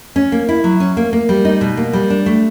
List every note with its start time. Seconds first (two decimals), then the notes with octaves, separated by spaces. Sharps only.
0.16 C#4
0.32 A#3
0.49 E4
0.64 F#3
0.80 C#4
0.97 A#3
1.13 A#3
1.29 G3
1.45 D#4
1.61 B2
1.77 A#3
1.93 G3
2.10 D4
2.26 A3